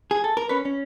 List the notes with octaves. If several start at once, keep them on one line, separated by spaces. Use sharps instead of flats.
G#4
A4
A#4
C#4 B4
C#4